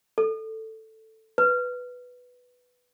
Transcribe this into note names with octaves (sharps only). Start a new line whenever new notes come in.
A4
B4